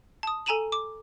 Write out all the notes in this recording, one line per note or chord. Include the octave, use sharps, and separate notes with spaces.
A5 D#6
A4 G#5 A#5 D#7 E7 F#7
D6